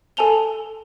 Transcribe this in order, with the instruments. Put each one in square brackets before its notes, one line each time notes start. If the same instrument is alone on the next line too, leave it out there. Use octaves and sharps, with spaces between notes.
[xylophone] A4 G#5 A5 F7 G7